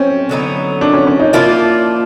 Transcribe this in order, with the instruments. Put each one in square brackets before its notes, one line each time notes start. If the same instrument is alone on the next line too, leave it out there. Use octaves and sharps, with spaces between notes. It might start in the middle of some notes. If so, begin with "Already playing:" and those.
Already playing: [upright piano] C4 C#4
[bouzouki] D3 F#3 B3 D#4
[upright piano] D4
C#4
C#4
D#4
[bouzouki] F3 A#3 D4 F4 [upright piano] E4